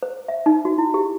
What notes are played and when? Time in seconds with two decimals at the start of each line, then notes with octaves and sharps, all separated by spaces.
0.03 C5
0.28 E5
0.46 D#4
0.65 F#4
0.78 E4
0.94 G4